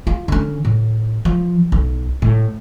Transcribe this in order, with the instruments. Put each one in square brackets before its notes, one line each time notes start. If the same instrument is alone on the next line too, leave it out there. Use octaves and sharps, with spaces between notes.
[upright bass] F4
D3 C#4
A2
F3
B1
A2